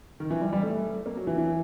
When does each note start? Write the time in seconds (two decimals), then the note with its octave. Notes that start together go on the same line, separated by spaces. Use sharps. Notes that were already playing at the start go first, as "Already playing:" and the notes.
0.20 D#3
0.31 E3
0.41 G3
0.53 G3
0.63 A3
1.06 A#3
1.17 F#3
1.27 E3
1.38 E3